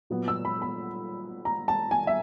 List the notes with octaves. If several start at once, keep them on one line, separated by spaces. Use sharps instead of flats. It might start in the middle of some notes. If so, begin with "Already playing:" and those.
A#2 F#3 B3
E6
B5
B5
A#5
A5
G#5
E5